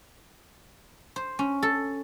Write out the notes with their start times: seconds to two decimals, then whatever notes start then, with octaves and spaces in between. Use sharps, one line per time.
1.16 C5
1.39 C#4
1.63 A4